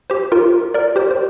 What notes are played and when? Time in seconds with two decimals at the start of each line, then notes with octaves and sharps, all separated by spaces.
0.10 G4 C5
0.32 F4 A#4
0.74 A#4 D5
0.96 G4 C5
1.11 C5